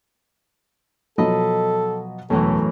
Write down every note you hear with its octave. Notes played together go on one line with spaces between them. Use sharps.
B2 F3 F#3 A4 D#5 B5
E1 F#2 A2 E3 A4